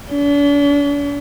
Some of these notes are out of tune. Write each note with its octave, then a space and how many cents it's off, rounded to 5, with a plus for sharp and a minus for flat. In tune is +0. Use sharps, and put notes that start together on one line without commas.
D4 -45